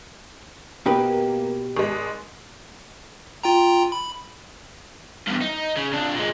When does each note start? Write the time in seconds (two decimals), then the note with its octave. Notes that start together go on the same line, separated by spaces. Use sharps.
0.86 B2 A#3 G4 B4
1.77 G#1 G#3
3.44 F4 G5 A#5
3.92 B5
5.27 E2 G2
5.41 D#4
5.76 C#3
5.92 F2 D4
6.15 A#2 G#3